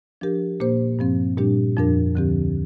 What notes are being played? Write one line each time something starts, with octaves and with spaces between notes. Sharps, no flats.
F3 D4 G4 A#4
A#2 A#3 G4 C5
G2 F3 C4
A#2 G3 D4 G4
F2 F3 D4 A#4
D2 D3 F3 C4 G4